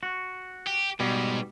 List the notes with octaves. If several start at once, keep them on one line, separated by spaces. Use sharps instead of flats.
F#4
G4
G#2 B2 G3